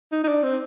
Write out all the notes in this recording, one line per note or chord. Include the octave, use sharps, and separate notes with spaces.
D#4
D#4
D4
C4